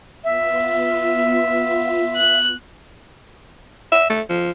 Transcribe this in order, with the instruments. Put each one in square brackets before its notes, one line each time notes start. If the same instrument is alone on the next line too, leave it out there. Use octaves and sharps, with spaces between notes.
[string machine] B3 F4 [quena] E5
[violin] F#6
[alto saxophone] E5
A3
F3